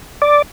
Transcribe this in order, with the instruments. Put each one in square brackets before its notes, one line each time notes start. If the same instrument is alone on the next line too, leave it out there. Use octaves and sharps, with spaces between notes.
[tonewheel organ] D5